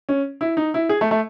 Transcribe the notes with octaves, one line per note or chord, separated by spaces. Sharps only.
C#4
E4
D#4
E4
G#4
A3
A3